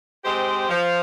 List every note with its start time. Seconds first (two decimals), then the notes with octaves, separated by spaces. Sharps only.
0.24 G#3 C4 G4 C5
0.69 F3